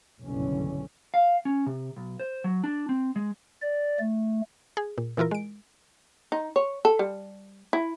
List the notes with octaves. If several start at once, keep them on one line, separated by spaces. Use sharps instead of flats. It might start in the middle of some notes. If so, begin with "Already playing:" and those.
F#1 B1 G2 D3 E3 C#4
F5
C#4
C3
B1
C5
F#3
D4
C4
G#3
D5
A3
G#4
A#2
A#2 E3 E4 F4 A#4
G#3 D7
D#4
C#5
A4
G3
E4